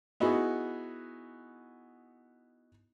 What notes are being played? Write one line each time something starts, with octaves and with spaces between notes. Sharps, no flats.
B3 D#4 E4 F#4 G#4